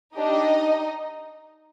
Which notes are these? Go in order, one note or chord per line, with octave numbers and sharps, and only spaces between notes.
D4 D#4 G4 D#5